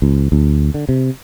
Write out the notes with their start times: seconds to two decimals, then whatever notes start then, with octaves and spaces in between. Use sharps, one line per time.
0.02 C#2
0.32 D2
0.74 D3
0.89 C3